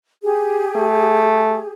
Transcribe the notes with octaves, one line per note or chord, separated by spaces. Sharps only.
G4 G#4
A3